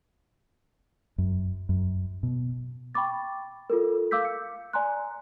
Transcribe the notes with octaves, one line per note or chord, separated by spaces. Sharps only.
F#2
F#2
B2
G5 B5 C#6 D6 A6
F4 A4 A#4
F5 D6 E6 G6 B6
C#7
D5 G#5 A#5 C6 F#6